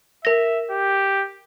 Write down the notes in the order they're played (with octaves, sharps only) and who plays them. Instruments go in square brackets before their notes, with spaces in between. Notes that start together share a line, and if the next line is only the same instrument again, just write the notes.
[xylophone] A#4 A#6 [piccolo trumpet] E5
[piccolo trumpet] G4